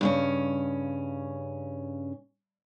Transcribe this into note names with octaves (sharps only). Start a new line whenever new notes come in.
G2 C#3 C#4